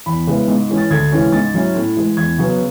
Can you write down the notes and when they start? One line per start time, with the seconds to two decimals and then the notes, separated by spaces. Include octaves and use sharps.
0.06 E2 B5
0.27 C#3 G#3 B3 E4
0.48 G#2
0.69 E3 G#3 C#4
0.77 A6
0.91 D2 G#6
1.12 C#3 E3 G#3 C#4
1.33 G#2 A6
1.54 F#3 C#4 E4
1.75 A2
1.96 E3 G#3
2.17 E2 G#6
2.38 C#3 F#3 B3